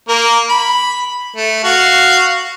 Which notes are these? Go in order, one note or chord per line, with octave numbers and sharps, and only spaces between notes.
A#3 A#4
B5
A3
F#4 F5